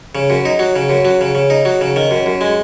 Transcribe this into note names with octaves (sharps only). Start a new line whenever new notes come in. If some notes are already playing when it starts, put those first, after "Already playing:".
C#3
F#2
D#4
F#3
C#3
F#2
F#3
C#3
C#3
D#4
F#3
C#3
D#3
F#2
F#2
G#3